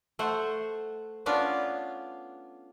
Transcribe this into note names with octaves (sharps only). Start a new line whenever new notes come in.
A3 C5 F#5
B3 C#4 D4 F4